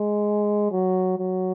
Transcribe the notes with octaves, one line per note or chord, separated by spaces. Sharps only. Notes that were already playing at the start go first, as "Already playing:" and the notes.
Already playing: G#3
F#3
F#3